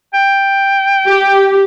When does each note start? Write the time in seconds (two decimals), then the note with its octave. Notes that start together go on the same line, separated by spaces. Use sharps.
0.14 G5
1.07 G4